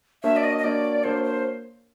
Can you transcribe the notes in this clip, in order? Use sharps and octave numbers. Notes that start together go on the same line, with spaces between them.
A#3 D4 F#4 A#4 C#5 E5
D5
D#5
D#5
A#3 D4 F#4 A#4 C#5 D5
A#3 D4 F#4 A#4 C5 C#5
C5